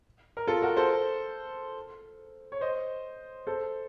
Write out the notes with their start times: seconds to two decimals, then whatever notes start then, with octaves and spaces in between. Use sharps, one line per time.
0.37 A#4
0.47 F4 A4
0.62 F#4 A#4
0.77 A4 C5
2.52 C#5
2.61 C5 D#5
3.47 A4 C5